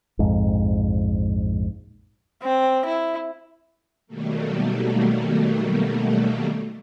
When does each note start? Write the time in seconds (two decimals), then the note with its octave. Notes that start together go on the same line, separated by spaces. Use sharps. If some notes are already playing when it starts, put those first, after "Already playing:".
0.19 A#1 F2 G#2
2.43 C4
2.86 E4
4.07 B2 D#3 F#3 G3 A3 A#3